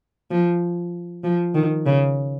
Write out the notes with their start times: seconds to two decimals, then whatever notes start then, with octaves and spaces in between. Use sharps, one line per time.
0.31 F3
1.24 F3
1.55 D#3
1.86 C#3